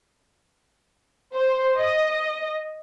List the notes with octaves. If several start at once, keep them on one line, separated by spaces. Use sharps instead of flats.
C5
D#5